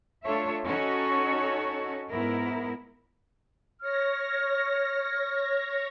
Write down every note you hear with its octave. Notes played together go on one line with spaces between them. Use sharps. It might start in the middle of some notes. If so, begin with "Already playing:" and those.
A3 D4 F4 A4 C#5 E5
C#4 D#4 F#4 A4 C#5
G#2 B3 E4 A#4
C#5 F6 A#6